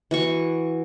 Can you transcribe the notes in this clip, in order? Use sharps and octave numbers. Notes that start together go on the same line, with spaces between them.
E3 F#4 C#6